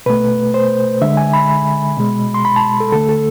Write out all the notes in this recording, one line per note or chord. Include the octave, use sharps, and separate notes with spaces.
B2 A3 B4
C5
D3 G#3 E5
G#5
B5
B2 G#3
C6
B5
A5
A4
D3 A3 A4
A4